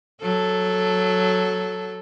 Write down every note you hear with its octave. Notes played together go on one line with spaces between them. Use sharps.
F#3 A4